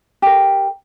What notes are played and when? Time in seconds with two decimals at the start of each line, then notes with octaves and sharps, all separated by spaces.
0.22 G4 A#4